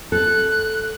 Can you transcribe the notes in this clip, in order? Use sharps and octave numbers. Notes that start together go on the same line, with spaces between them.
A4 F#6